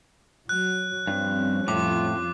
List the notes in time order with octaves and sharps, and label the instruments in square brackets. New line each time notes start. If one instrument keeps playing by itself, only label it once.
[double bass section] F#3 [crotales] F#6
[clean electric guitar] G2 [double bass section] F3 G3 C#4 [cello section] C4
[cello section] F2 F4 [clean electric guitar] A2 [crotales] D6